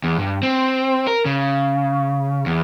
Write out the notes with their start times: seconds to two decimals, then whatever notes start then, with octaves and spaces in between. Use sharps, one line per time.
0.04 E2
0.19 G2
0.43 C4
1.07 A#4
1.25 C#3
2.46 E2